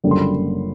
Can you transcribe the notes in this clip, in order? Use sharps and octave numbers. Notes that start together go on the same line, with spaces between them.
F#1 F#2 D3 G3 A#3
C6
B5